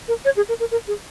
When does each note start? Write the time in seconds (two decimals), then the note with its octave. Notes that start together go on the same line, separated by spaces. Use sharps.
0.08 A#4
0.25 C#5
0.37 G#4
0.49 A#4
0.60 A#4
0.71 A#4
0.87 G#4